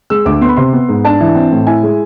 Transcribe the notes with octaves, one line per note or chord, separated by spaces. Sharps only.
G#3 E6
D2 D6
B3 C6
B5
C3 C6
B3
G#2
D4 A5
E3
C4
A2
E4 G#5
G#3